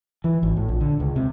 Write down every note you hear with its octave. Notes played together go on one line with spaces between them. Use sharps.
E3
G#1
A2
A#1
D3
C#2
C3